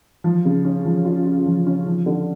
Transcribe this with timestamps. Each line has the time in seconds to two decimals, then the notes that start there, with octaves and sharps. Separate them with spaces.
0.24 F3
0.45 C#3
0.65 C#4
0.85 F3
1.05 F4
1.26 F4
1.46 F3
1.67 C#4
1.86 F3
2.06 D3